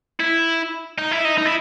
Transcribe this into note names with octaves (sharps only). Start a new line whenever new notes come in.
E4
D#4
E4
D#4
D#4
E4